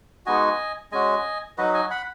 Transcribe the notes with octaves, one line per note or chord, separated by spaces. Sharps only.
G#3 B3 D#4 F#4 D#5 G#5
G#3 C#4 F#4 D#5 G#5
F#3 D#4 F#4 B4 D#5
D#5 G#5
F#5 B5